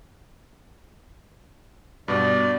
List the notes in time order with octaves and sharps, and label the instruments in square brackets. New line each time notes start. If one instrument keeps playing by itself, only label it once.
[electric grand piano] G2 B2 [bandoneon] D5